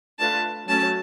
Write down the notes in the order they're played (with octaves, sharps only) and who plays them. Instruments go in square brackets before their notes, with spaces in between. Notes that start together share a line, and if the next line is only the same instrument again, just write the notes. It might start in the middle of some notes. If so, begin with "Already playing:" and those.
[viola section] A3 D4 F4 B4 [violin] A5
[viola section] F#3 A3 C#4 F#4 [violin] A5